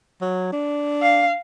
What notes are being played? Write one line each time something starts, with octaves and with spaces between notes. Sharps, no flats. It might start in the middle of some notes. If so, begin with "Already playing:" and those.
F#3
D4
F5